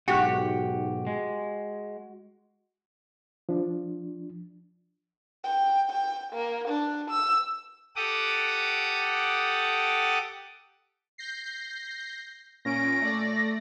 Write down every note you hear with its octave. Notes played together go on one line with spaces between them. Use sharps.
B1 G#2 F#4 G4 F#5
G#3
F3 D4
G5
G5
A#3
D4
E6
G4 A4 F#5 D6 D#6
G6 A#6 C7
A#2 C#4 A#6 D7
A3 D5